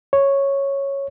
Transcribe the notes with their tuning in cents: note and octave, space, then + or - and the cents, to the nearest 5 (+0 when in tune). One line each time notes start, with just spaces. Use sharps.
C#5 -5